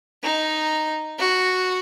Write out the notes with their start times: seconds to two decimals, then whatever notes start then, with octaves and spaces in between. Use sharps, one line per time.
0.23 D#4
1.19 F#4